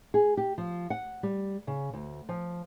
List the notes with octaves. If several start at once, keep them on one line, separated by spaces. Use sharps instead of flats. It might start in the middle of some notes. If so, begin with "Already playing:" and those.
G#4
G4
F3
F#5
G3
C#3
D2
F3